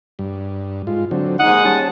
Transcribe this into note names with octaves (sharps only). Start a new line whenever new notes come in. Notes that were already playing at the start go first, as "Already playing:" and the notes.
G2
G#2 F4
D3 F#3 C4
D#2 G#2 D#4 F#5 D#6
G3 C#4 A5